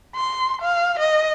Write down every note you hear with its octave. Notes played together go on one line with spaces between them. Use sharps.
C6
F5
D#5